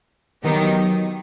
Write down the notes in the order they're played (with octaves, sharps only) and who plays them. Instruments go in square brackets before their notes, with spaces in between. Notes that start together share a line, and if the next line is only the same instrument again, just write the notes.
[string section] D#3 F#3 B3 D#4 G4